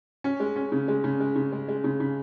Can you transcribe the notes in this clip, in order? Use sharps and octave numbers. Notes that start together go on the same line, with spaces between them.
C#4
G#3
C#4
C#3
G#3
C#3
G#3
C#3
G#3
G#3
C#3
C#3